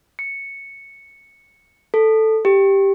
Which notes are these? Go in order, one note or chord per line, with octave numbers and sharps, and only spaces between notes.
C#7
A4
G4